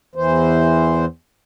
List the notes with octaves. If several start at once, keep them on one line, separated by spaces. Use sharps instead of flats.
E2 E3 C5